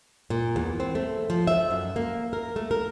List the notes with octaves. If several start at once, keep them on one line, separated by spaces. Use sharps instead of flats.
A#2
E2
C4
A3
F3
E5
F#2
A#3
A#4
A3
A#4